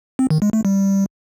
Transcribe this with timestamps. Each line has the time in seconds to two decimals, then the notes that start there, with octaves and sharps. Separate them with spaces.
0.19 C4
0.30 D#3
0.42 G#3
0.53 A3
0.65 G3